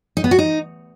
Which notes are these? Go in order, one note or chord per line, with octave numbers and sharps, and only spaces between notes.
D#4
B3
F#4
D#4